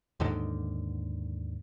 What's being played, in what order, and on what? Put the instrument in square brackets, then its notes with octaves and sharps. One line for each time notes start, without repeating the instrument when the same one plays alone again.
[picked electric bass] D#2 G#2 D3 D#3